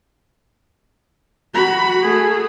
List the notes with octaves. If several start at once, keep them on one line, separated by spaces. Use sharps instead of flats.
F#4 B5
A3 G#4